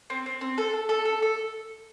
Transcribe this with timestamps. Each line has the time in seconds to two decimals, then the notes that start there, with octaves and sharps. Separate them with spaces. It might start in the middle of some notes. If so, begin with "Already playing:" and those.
0.10 C4
0.26 C4
0.41 C4
0.58 A4
0.73 A4
0.89 A4
1.05 A4
1.22 A4